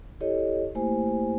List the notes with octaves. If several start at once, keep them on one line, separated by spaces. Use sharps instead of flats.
E4 G4 A4 C#5 D#5
A3 A#3 E4 G4 C5 G#5